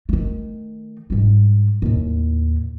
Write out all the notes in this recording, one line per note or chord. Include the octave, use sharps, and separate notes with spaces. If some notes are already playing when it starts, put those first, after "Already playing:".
D#3 A3
G#2 G3
D#2 A2